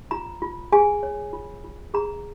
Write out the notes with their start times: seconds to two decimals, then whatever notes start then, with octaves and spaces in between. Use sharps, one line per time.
0.11 F4 A#5
0.42 F4
0.72 G#4 G#5
1.03 C#5
1.33 F4
1.64 F4
1.94 G#4 A#5